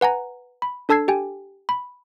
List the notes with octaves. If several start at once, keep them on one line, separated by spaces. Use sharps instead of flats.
B4 F#5 G#5 A#5
B5
D4 A4 A5 E6 G#6 C7
G4 G5 G#5
B5